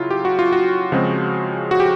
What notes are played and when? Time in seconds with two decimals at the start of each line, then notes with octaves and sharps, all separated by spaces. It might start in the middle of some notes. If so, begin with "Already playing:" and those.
Already playing: C#3 F#3 E4 F4
0.10 G4
0.25 F#4
0.39 F4
0.52 F#4
0.92 C#3 F3 G#3 C4
1.71 F#4
1.80 G4